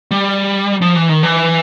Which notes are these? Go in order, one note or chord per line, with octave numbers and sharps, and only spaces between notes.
G3
F3
E3
D#3
E3